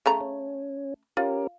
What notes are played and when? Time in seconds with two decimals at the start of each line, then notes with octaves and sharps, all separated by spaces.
0.06 C#3 A3 A#5
0.21 C#4
1.17 C#4 F4 G4 A#4